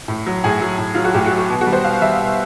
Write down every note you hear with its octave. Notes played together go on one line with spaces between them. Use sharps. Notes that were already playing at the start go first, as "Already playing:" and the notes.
A2
F#3
A2 G#4
F#3
A2
F#3 F4
F#4
A2 G4
F#4
F#3
F#4
B2
F#4
G3
C5
B2 F5
G3 E5
B2